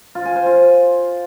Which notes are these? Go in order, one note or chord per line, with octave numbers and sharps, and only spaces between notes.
F4
G#5
C5
F4